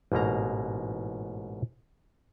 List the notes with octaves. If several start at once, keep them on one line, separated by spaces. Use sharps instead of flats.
A1 G#2 B2 A#3 A#5